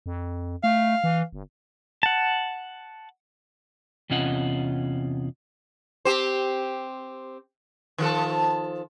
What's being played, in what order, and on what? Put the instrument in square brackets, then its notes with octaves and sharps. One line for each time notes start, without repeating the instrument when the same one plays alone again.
[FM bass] F2
[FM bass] A3 [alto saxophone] F5
[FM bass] E3
G1
[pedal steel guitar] F#5 A5
[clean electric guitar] E2 C3 C#4 F4 D#5 F#5
[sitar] C4 G4 C5
D#3 F3 A4